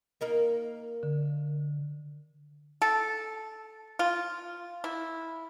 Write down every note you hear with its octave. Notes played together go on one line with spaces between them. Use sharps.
A#3 D#4 A#4
D3
A4
F4
E4